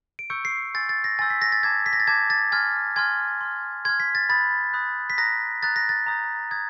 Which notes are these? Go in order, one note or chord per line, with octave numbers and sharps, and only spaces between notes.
D7
C#6 E6 G6 C#7
C7
G#5 C6 E6 G6 A6
A6
A#6
G#5 C6 E6 G6 A6
B6
A#6
A6
A5 D6 G6 G#6
B6
A#6
A6
A5 D6 G6 G#6
A6
G#5 C6 F6 G#6
G#5 C6 F6 G#6
C6 F6
C6 F6 G#6
B6
A6
B5 D#6 F#6 A6
B5 D#6 F#6
B6
A#5 D#6 F#6 A#6
A#5 D#6 F#6 A6
A#6
A6
A#5 D#6 G6
A#5 D#6 G6 G#6